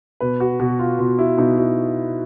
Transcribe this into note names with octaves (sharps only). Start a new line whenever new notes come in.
B2 B4
F#4
B2 F#4
F4
B2 F4
E4
B2 D#4
E4